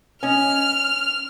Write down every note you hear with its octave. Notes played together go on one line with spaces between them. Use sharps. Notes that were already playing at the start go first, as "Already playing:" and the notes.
C#4 D#5 F6